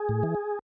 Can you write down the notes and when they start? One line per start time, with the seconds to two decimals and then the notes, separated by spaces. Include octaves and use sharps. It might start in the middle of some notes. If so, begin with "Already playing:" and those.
Already playing: G#4
0.09 A2
0.23 E3